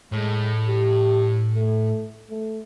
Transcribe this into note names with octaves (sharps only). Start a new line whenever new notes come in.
A2 G#3
G4
A3
A3